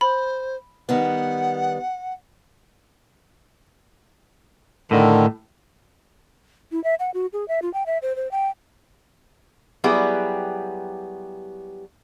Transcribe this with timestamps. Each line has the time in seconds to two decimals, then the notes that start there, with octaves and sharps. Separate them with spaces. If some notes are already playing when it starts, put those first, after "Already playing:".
0.01 C5 B5
0.89 D#3 G3 B3 F#5
4.91 A2 D3 D#3
6.72 E4
6.84 E5
7.00 F#5
7.14 F#4
7.33 G#4
7.48 E5
7.62 F4
7.74 G5
7.86 E5
8.02 C5
8.16 C5
8.31 G5
9.84 F#3 G3 B3 E4 G4 G#4